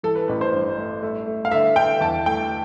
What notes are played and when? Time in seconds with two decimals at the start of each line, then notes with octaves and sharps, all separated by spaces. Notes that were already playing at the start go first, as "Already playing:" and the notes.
0.03 E3 A4
0.15 B4
0.28 A1 B4
0.41 C5
0.52 G2
0.78 A3
1.02 A3
1.27 A3
1.45 F5
1.51 D3 E5
1.76 D3 G5
2.01 E2 A5
2.26 A3 G5